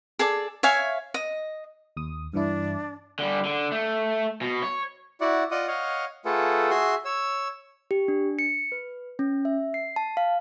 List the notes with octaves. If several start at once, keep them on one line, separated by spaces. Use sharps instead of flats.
G#4 A4 D5
C#5 E5 F5 G#5
D#5
D#2 D#6
G2 E3 D4 E4
D3 G3
D3
A3
B2
C#5
E4 F#4 D5 F#5
F4 D5 D#5 F#5 D#6
C#5 D#5 F5 F#5
A3 F4 G#4 A4 B4 F#5
F#4 G#4 E5 C6
C#5 E6
G4
D4
C#7
B4
C#4
E5
C7
A5
F5